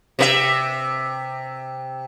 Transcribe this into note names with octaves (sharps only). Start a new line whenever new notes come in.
C3 A#4 E5